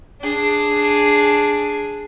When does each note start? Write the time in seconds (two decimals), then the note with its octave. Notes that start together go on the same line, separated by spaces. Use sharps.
0.22 D4 G#4